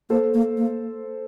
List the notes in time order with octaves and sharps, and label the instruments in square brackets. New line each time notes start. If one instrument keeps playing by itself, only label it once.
[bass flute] A#3 [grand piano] A4 C5
[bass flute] A#3
A#3